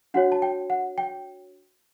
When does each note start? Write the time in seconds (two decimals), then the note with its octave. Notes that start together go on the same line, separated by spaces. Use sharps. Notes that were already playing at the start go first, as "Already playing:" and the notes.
0.14 D4 F#4 C#5 F#5
0.32 A5
0.42 G5
0.70 F#5
0.98 G5